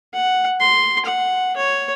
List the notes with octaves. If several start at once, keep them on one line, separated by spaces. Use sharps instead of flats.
F#5
C6
F#5
C#5